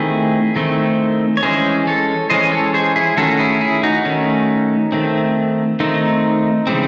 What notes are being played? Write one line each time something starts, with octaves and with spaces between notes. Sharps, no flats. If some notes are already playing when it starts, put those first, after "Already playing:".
Already playing: D#3 A3 C4 E4 G#4
D#3 A3 C4
C#5
E3 G#3 C#4 G#4 C5
A4 C#5
E3 G#3 C#4 C5 D#5
A4 C#5
G#4 C5
E4 G#4
D#3 A3 C#4 F#4 A4
E4 G#4
E4 G#4
D#4 F#4
D#3 A3 C#4
D#3 A3 C4
D#3 A3 C4 D#4
C#3 E3 G#3 C4